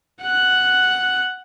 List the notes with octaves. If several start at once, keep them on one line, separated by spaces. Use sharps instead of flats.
F#5 F#6